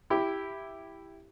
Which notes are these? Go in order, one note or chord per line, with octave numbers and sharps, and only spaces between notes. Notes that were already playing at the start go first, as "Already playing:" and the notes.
E4 G4